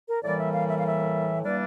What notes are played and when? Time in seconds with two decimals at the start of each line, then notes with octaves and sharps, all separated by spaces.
0.09 A#4
0.23 A2 E3 G3 A#3 D5
0.38 E5
0.53 F5
0.68 E5
0.78 F5
0.87 E5
1.44 E3 G3 A#3 D4 D5